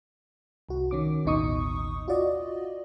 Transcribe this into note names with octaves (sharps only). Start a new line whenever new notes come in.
C2 F#4
D#3 C#4 D6
A1 D#2 B2 D#4 C#6 D#6
F4 F#4 D5 D#5